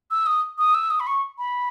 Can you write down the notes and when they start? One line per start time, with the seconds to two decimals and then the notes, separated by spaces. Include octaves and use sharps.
0.11 E6
0.26 D#6
0.58 D#6
0.74 E6
0.90 D#6
1.00 B5
1.07 C#6
1.38 B5